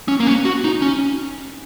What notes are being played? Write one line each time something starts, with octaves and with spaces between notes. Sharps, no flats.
C#4
A#3
C#4
F#4
D#4
C#4